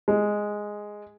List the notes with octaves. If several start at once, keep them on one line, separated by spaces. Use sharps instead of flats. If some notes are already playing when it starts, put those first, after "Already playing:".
G#3